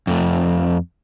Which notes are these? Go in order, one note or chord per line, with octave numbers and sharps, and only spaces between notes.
F2 A3